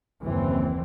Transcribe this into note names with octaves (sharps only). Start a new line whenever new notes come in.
F#1 D#2 E3 C4